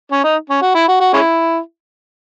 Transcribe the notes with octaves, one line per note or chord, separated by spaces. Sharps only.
C#4
D#4
C#4
F#4
E4
F#4
F#4
G#3 C#4 E4